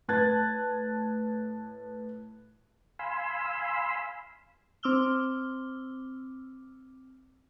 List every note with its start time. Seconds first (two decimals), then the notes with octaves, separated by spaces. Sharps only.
0.08 A2 B4 A5 F#6 G#6 A6
2.99 F5 G#5 B5 C6 E6
4.83 C4 D6 E6 F6 G7